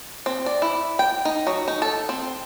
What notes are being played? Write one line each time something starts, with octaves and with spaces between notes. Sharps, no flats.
C4
D5
E4
G5
D#4
F#3
D#4
A4
C4